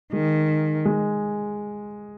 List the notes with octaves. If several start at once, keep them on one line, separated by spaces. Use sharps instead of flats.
D#3 G#3
G#3